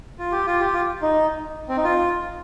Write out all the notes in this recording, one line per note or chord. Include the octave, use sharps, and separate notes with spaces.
F4
G4
F4
G4
F4
D#4
C4
D#4
F4